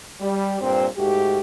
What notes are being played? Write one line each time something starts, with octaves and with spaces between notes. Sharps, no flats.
G3
G2 A#2 C4
G#2 A3 F#4 G4